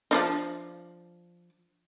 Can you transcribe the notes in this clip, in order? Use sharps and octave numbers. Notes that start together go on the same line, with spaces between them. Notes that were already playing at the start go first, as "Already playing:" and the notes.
F3 D4 D#4